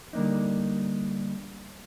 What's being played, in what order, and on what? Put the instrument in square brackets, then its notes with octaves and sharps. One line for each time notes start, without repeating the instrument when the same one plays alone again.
[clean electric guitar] D3 G3 A#3 D4 D#4